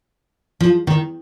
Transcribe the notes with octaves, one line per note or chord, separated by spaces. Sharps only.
F3
D#3